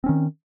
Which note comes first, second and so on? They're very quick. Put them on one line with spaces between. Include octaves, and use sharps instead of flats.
C4 C#4 D#3